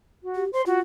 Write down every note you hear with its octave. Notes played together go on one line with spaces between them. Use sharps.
F#4
G4
C5 C6
F4 F#4